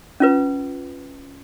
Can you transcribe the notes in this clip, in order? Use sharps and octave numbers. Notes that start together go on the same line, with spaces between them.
C#4 F4 B4